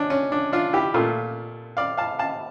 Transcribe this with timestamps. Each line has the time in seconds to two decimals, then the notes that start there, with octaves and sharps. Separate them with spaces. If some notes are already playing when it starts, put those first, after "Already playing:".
Already playing: C#4 D4
0.10 C#4
0.32 D4
0.52 D4 F4
0.73 E4 G4
0.94 A#2 A3 F4 A4
1.77 D5 F5
1.97 F5 A5
2.19 F5 A5